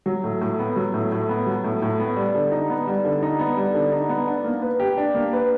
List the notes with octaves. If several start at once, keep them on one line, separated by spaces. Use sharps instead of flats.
F#3
A2
A2
B3
F#3
A2
A2
B3
F#3
A2
A2
B3
G3
D3
D#4
B3
G3
D3
D#4
B3
G3
D3
D#4
B3
D4
A#3
B4
G4
D4
A#3
B4